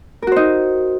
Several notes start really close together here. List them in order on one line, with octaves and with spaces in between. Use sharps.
A#4 F#4 C5 D#4